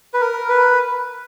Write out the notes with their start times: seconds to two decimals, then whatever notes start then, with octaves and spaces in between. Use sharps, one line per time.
0.14 B4
0.21 A#4
0.49 B4